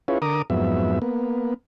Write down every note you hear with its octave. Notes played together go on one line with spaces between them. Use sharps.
C#4 E4 F4 G#4 B4 C#5
D3 A#4 A#5 D6 D#6
F2 G#2 F#3 B3 E5
A#3 B3